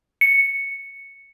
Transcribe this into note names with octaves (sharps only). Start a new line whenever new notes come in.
C#7